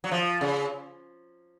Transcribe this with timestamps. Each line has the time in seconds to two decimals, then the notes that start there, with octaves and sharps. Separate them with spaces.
0.04 F#3
0.11 F3
0.41 C#3